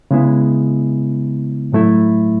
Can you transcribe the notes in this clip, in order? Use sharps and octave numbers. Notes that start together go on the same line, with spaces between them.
C#3 G#3 B3 E4
A2 F#3 A3 E4